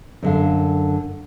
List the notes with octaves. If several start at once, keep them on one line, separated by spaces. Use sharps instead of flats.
F#2 D3 F5